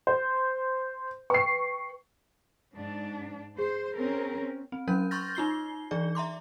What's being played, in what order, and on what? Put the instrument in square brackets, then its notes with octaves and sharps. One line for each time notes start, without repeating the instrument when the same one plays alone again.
[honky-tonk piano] C5
[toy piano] B4 G5 [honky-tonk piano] C#6 C7
[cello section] G#2 D4
[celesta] G#4 [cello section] C5
[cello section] C4 C#4 A#4
[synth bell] C4
F#3 C#4 A#4 G6
C6 C#6 F6 G6 A6 A#6
D#4 F4 C7 G7
E3 D4 G#4 D5
E5 A#5 C6 D6